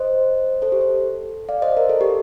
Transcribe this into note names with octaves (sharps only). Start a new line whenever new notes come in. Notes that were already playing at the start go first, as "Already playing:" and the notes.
Already playing: C5 D#5
A4 C5
G4
A4
D5 F5
C5 D#5
A#4
A4
G4